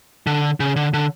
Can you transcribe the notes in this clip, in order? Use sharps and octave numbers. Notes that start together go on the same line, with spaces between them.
D3
C#3
D3
D3